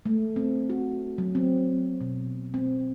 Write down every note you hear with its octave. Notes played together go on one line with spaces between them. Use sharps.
A3
C4
F#4
F#3
C4
B2
C4